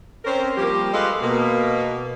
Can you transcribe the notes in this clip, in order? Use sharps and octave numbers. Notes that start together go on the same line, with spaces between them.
C4 C#4 A#4
F3 G3 A#3 G4
G#3 F4 A4 B4 D#5 F5
B2 A#3